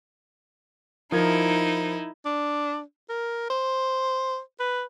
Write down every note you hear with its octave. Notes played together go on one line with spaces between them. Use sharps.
F3 D#4 E4 A#4 G#6
D4
A#4
C5
B4